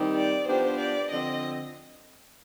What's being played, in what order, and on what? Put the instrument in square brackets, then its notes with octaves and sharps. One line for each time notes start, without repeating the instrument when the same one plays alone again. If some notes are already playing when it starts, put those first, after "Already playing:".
Already playing: [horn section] D#3 G3 C4 D#4 G4
[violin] D5
[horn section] F3 B3 D4 G4 [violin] C5
[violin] D5
[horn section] D3 F3 C4 [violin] D#5